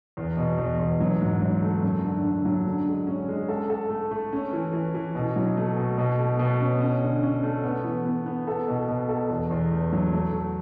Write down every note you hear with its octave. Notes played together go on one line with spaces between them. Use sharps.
E2
B2
E2
E2
F#3
G#2
F#3
A3
F#2
D3
D3
F#3
D3
G#3
C#4
G#3
A4
A4
A3
A3
C#4
E3
E3
E3
B2
F#3
A3
B2
B2
A3
B2
C#4
C#4
D3
C#4
A3
B3
E3
B3
B3
A4
B2
B2
A4
E2
E2
A3
F#3
A3
A3